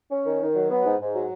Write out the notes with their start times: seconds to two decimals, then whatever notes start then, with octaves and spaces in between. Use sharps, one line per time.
0.11 C#4
0.26 D#3
0.41 D#3
0.55 F#3
0.70 B3
0.85 G#2
1.00 G#2
1.14 F#3